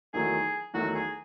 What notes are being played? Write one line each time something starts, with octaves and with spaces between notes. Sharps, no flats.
E2 D#3 F#3 A3 G#4
E2 D#3 F#3 A3 F#4
G#4